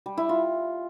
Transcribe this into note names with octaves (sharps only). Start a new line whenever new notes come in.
G3
E4
F4